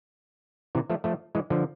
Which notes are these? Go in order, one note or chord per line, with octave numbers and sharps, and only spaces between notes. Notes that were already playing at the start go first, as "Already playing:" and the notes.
C3 E3
F3 A3
F3 A3
E3 G#3
D3 F3